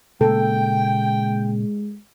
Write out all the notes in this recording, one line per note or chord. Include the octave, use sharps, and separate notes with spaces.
A#2 C#3 G#3 A#3 A4 G5